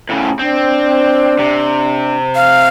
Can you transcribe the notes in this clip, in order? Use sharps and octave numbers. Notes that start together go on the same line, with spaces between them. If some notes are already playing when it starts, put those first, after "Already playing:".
A2 C#3
C4 D4
C3
F5